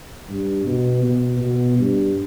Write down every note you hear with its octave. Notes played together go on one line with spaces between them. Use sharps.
G2
B2
B2
B2
G2